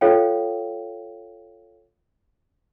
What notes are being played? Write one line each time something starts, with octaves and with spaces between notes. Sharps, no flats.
F4 A4 C#5 F5 G5